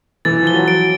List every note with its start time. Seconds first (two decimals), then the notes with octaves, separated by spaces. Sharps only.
0.25 E3 A6
0.43 F3 G7
0.54 F#3
0.68 D7